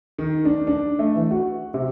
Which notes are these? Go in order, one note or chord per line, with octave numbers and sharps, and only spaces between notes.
D#3
D4
D4
A3
E3
F#4
C3